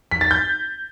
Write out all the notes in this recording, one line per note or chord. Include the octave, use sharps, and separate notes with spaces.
B6
A6
G6